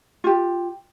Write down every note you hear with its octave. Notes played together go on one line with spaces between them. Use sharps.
F4 G4